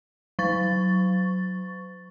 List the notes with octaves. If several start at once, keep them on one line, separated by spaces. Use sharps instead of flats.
F#3 C#6 A6